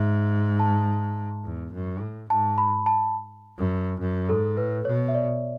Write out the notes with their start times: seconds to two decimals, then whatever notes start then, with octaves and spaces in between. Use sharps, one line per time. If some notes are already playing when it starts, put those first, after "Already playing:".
Already playing: G#2 E5
0.60 A5
1.44 E2
1.73 F#2
2.01 A2
2.30 G#2 A5
2.58 B5
2.86 A5
3.58 F#2
4.00 F#2
4.29 G#2 A4
4.57 A2 B4
4.85 B2 C#5
5.08 E5
5.14 D5